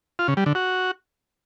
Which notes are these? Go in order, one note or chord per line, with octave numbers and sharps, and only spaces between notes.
F4
C#3
G3
D3
F#4